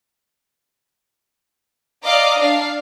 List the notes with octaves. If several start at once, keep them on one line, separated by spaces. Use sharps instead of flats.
D5 D#5 F5 A#5 D6
D4 F5